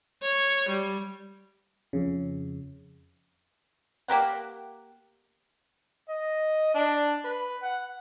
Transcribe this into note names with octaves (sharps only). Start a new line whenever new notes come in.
C#5
G3
F2 C#3
A#3 G4 A#4 F#5
D#5
D4
B4
F#5